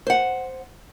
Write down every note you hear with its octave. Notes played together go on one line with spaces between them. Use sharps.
C5 F#5